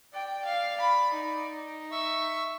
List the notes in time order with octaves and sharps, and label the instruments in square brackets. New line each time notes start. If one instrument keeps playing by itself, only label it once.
[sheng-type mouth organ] D5 [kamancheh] G5
[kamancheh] F5
B5
D#4
[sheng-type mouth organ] E5 C#6 E6